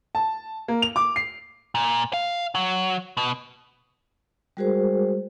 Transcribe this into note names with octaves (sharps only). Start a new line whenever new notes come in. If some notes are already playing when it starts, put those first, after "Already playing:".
A5
A#3
F7
D6
C7
A#2
F5
F#3
B2
G3 G#3 F#4 G#4 A#4 C5